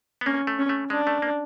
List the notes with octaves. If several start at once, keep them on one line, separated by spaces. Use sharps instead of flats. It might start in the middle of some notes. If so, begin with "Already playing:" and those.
B3
A#3 C#4
A3
C#4
A3
G#3 D4
A3
A#3